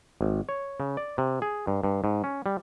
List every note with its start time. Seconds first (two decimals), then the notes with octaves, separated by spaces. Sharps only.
0.21 G#1
0.49 C#5
0.80 C#3
0.97 D5
1.18 C3
1.42 G#4
1.67 G2
1.84 G2
2.04 G#2
2.24 C#4
2.46 G3